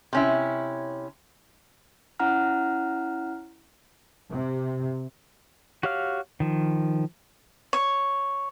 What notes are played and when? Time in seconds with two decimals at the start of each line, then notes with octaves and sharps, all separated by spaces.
0.13 C3 C#4 E4
2.20 C#4 E4 F#5 A#5 F6
4.30 C3
5.83 F#4 G4 C#5 F5 F6
6.40 D#3 F3
7.73 C#5